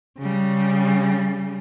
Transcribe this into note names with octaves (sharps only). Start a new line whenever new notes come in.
C#3 G3